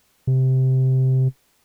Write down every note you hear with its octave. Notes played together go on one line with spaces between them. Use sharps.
C3